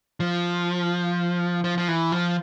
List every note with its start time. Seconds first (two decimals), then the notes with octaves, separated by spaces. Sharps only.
0.20 F3
1.64 F3
1.78 F3
1.88 E3
2.12 F3